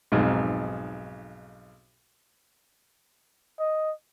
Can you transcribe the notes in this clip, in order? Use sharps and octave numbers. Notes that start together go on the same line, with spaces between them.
B1 F2 G#2
D#5